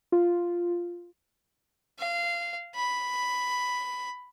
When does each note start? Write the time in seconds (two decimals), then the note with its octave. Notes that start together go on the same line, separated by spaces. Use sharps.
0.12 F4
1.99 F5
2.75 B5